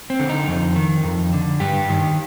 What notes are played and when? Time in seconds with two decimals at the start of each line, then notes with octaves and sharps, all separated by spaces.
0.10 C4
0.19 D3
0.29 D#4
0.48 F2
0.76 D#3
1.04 F2
1.33 D3
1.60 G2 G4
1.89 D#3